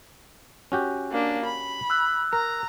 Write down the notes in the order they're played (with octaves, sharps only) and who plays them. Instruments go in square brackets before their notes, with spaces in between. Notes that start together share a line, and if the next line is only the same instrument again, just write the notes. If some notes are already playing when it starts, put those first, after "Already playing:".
[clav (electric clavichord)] C#4 F#4 G4
[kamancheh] A#3 D4
B5
[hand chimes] E6 F#6
[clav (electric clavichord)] A#4 [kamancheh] A#5